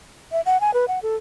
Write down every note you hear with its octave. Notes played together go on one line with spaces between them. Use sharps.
E5
F#5
G#5
B4
F#5
A4